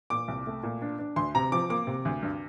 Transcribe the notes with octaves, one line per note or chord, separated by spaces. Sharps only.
A#2 D6
C2
A3
A#2
D4
D4
D2 C6
C3 A#5
F3 D6
A#3 D6
C3
D2
G2